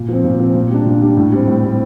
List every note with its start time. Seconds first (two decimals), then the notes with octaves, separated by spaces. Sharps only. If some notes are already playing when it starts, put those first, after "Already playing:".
Already playing: A#2
0.09 F3 C4
0.24 A#2
0.39 F3 C4
0.55 A#2
0.71 G3 D4
0.86 A#2
1.02 G3 D4
1.17 A2
1.32 G3 C4
1.48 A2
1.63 G3 C4